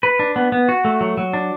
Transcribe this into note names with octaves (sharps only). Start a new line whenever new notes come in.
B4
D4
B3
B3
F#4
A3
F#3
F#3
D4